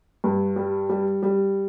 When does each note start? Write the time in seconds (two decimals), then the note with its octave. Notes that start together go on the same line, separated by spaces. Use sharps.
0.24 G2
0.56 G3
0.89 G3
1.23 G3